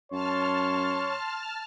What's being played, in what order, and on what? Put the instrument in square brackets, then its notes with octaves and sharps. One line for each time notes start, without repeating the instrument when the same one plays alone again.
[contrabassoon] F#2 [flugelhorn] C#5 [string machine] A5 F6 [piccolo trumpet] C6